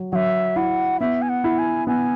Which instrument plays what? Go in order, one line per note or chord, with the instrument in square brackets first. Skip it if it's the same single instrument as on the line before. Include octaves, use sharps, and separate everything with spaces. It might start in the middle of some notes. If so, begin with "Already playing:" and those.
Already playing: [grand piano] F#3
[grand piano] F#3 [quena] E5 F#5
[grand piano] E4 [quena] F#5
[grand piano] B3 [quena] E5
[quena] G#5
F#5
[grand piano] E4
[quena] G#5
[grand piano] B3 [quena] G#5